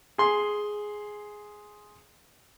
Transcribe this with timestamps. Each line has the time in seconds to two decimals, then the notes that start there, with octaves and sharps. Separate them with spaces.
0.18 G#4 C6